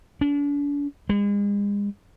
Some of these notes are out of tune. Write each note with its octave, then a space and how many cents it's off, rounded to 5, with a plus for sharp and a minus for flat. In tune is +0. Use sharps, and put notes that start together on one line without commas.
D4 -40
G#3 -40